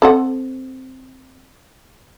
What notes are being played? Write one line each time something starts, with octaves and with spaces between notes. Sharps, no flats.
C4 A4 F#5